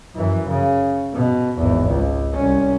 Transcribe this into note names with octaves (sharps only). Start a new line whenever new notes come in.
F#2 E3
C#3
B2
G#1 E2
C#2
C2 C#4